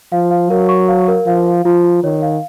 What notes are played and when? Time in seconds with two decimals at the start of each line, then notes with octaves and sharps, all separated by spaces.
0.12 F3 F5
0.31 F5
0.50 F#3 A#4
0.69 C#6
0.88 F5
1.08 A#4
1.26 F3 F5
1.46 F5
1.65 F3 F4
1.84 F4
2.04 D#3 C#5
2.22 F5